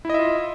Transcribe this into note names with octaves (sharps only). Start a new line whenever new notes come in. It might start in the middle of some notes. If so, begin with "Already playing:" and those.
E4 F4 D#5 E5